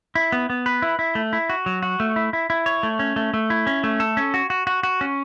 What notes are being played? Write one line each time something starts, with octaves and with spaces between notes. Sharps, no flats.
E4
B3
B3
B4
E4
E4
A3
E4
F#4
F#3
F#4
A3
E4
E4
E4
C#5
A3
C#4
A3
A3
E4
C#4
A3
A4
C#4
F#4
F#4
F#4
F#4
C#4